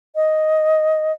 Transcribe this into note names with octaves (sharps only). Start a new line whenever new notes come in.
D#5